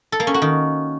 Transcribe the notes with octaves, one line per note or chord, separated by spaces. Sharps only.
A4
A#3
C#4
F#4
D#3